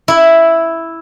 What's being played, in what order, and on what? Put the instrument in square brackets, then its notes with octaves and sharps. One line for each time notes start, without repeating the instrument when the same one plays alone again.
[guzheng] E4